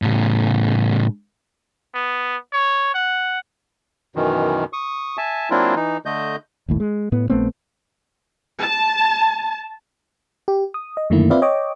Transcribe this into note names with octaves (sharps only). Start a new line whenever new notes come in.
A2 C#3
B3
C#5
F#5
F#2 B2 D#3 E3
C#6 D#6
E5 G#5 A5
F#3 A#3 C4 D4 E4 F4
E3 D#4
D3 A3 D#5 G6
G#1 D#2 A2
G#3
A2 B3
A#1 A3 B3 C4
A5
G4
D#6
D#5
F#2 D3 D#3 A3 A#3 E4
C4 F4 B4 D5 E5 F5
C#5 D#5 G5 D6